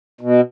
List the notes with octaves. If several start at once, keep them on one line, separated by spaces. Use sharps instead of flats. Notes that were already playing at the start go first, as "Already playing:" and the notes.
B2